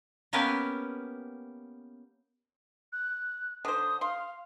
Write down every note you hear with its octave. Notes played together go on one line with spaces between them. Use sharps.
A#3 B3 C#4 G4 A#4 B4
F#6
D3 C5 D#6
F5 C6